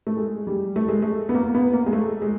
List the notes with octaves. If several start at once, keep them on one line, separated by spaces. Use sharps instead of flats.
A3
G#3
G3
A3
G#3
A3
B3
A#3
B3
A#3
G#3
A3
G#3